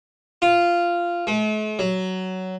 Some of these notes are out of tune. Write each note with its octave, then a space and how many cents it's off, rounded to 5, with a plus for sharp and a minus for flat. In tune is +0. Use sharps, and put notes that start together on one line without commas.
F4 -10
A3 -45
F#3 +15